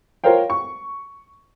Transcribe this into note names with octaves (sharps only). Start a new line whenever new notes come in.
F4 A#4 C5 C#5 F5 G5
C#6